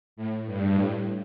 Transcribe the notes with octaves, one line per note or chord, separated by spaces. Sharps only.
A2
G2
A2